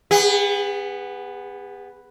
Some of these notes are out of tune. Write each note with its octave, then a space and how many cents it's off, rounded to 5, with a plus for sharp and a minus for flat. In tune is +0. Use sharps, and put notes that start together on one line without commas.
B3 +0 G#4 -45